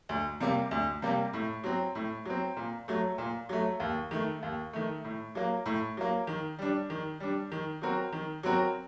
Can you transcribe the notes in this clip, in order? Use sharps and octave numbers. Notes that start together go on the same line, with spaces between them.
D2
C3 G3 A#3
D2
C3 G3 A#3
A2
F#3 C4
A2
F#3 C4
A#2
F#3 A3
A#2
F#3 A3
D#2
D#3 A3
D#2
D#3 A3
A2
F#3 A#3
A2
F#3 A#3
D#3
G3 D4
D#3
G3 D4
D#3
F#3 C4 F#4 A#4
D#3
F#3 C4 F#4 A#4